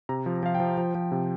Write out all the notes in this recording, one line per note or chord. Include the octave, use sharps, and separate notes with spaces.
C3 A#5
F3
F3 F5
G5
F3
F3
F3
C3